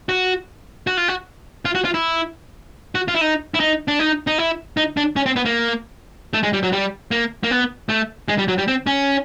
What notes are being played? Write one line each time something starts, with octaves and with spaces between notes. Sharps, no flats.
F#4
F#4
F4
F#4
F4
F#4
F4
E4
F#4
F4
E4
D#4
E4
D#4
D4
D#4
D#4
E4
D#4
D4
C#4
C4
B3
A#3
A3
G#3
G3
F#3
G3
A#3
A#3
B3
A3
G#3
G3
F#3
G3
C4
C#4